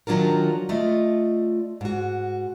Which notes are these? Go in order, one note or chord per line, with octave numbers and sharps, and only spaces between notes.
D#3 F3 F#3 D4 F4 A#4
A3 F4 D5 D#5
G#2 F#4